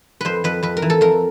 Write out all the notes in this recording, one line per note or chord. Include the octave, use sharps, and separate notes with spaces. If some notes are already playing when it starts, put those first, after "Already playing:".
F2 B4 C5
F2 B4
F2 B4
A#4
E3
A4
F2 A#4